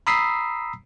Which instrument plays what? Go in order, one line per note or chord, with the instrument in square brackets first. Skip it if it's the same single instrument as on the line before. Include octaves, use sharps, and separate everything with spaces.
[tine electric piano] A#5 B5 D#6 E6 B6 C7